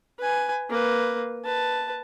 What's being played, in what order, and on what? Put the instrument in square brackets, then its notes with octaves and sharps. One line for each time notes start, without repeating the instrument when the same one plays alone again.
[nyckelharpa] B4 G#5
A#3 B4
B4 A5